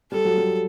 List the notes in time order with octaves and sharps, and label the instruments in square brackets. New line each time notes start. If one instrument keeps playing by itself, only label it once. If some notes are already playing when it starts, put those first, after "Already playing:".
[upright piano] G3 [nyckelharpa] A4
[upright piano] F#3
G3